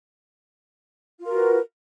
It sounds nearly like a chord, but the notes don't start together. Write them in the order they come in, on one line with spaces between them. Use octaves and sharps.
F4 A#4 F#4 B4